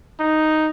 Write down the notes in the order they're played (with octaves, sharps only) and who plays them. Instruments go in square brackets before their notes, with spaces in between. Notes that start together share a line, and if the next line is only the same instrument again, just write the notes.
[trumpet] D#4